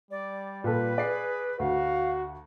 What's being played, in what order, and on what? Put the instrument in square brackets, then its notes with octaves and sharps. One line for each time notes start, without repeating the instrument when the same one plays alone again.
[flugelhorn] G3 [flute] D5
[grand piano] A#2 A4 [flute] B4
[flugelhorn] G#4 [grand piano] D5 C7
[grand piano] D2 [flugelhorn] F#4 [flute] F5